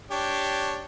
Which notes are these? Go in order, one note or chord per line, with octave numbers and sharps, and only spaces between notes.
D4 G4 C#5